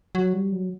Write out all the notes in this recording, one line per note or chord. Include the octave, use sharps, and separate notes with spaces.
F#3
G3
F#3